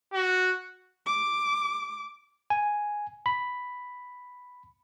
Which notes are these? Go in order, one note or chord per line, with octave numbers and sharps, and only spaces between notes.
F#4
D6
G#5
B5